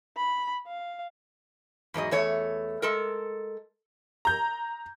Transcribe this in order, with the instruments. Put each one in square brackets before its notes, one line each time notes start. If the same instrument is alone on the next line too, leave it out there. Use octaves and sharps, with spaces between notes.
[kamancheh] B5
F5
[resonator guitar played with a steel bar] E2 G#2 F#3 D#5
E2 A3 C#5
G#3 A4 A#4
[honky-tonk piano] A#5 G6